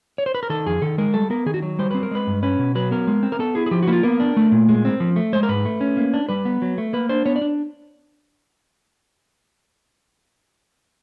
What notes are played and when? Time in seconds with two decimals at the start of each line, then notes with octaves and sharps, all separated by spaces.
0.18 C#5
0.26 C5
0.35 B4
0.43 A#4
0.50 D#3 A4
0.66 F2 G#4
0.82 D#3 A4
0.98 G#3 A#4
1.14 G3 A4
1.30 B3 A#4
1.46 D#3 G#4
1.54 F#4
1.62 F#3
1.79 G3 C5
1.91 C4 B4
2.03 A#4
2.11 G#3 B4
2.27 G2
2.43 C#4 B4
2.59 B2
2.75 F#3 B4
2.91 B3 A#4
3.07 G#3
3.23 C4
3.32 A#4
3.39 B3 A4
3.55 E4 G#4
3.66 G#4
3.71 F3 G4
3.83 F#4
3.88 A#3 E4
3.93 F4
4.03 B3 A#4
4.20 D4
4.37 A3
4.52 A#2
4.69 G#3
4.85 C4
5.00 F3
5.16 A3
5.33 G#3 C5
5.43 A#4
5.49 G#2 B4
5.65 A3
5.81 C#4
5.97 A#3
6.14 D4
6.29 G3 B4
6.45 B3
6.62 F#3
6.78 A3
6.93 A#3 B4
7.09 D4 C5
7.26 B3 C#5
7.36 D5
7.41 D4